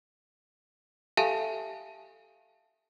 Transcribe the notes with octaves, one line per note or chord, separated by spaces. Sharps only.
G4 A4 E5 F5 G#5 A5